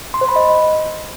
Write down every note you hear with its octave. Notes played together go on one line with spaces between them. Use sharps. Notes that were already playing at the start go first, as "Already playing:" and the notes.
C6
C5
B5
D#5